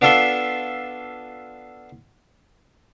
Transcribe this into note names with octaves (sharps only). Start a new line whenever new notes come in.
B3 D4 F4 A4 E5 C6